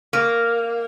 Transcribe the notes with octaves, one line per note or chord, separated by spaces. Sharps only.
A#3